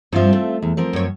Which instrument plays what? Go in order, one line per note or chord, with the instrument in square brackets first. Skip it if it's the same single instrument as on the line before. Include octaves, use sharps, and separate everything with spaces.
[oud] G2 F3 [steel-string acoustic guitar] C4 F4 E5
[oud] A3
[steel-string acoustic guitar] E2
F3 C4 A#4
[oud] F#2 C#5